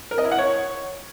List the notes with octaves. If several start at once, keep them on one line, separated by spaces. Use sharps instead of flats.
A#4
D#5
E4
F#5
C#5